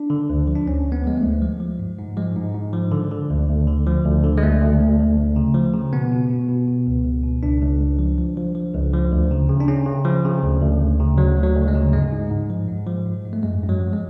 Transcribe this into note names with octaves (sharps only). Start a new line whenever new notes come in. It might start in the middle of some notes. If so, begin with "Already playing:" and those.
Already playing: D4
D3
D2
F3
D4
D2 C#4
D2
B3
F3 G#3
A3
D2
F3 G#3
F3
G#2
G#2
F3 G#3
G#2
G#2
F3
D3
D3
D2
D2
D3
F3
D2
D3
G#3
D2 A3
D2
D2
D2
D2
C#3
F3
C#3
B2 B3
B2
B2
B2
B2
C#2
C#2
B2
C#2 D4
C#2
C#2
F3
F3
F3
F3
C#2
F3
D2
C#3
C#3
D4
C#3 C#4
C#3
F3
C#3
D2
D2
D2
C#3
D2 F#3
D2
F#3
D2
G#3
C#3
G#2 G#3
G#2
G#2
F3
G#2
F3
G#2
G#2
A3
F#2 G#3
F#2
F#3
F3
G#3